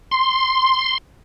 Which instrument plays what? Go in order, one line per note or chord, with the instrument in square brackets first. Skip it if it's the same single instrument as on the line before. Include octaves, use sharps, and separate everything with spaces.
[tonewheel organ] C6